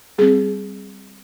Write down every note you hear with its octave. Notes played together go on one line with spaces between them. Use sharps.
G3 C4 G#4